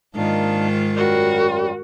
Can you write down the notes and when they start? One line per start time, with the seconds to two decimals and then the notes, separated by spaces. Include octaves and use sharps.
0.15 G#2 D#3 A#3 D4 D#4 F4
0.95 F#2 G3 F#4 A#4